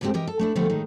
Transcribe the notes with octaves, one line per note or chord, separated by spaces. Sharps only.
D2 G#2 G#3 A3 C4 G4
E3 G4 A#4 D#5 G5
A4
A3 D4 E4
D3 F3 G3 A3 B3
A2 D#3 G#3 D#4